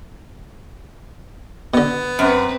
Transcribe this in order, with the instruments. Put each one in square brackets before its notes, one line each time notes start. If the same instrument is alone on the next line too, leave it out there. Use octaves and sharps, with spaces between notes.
[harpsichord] B2 D3 [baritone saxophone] B3
[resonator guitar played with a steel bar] F#2 [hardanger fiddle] C4 B4